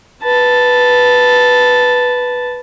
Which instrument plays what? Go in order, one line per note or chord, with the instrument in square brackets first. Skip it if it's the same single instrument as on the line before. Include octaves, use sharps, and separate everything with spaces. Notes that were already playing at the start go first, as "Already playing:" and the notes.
[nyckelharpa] B4 A5